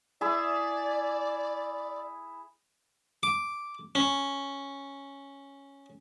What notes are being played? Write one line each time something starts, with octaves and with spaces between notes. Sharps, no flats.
E4 G#4 D5 E5
D6
C#4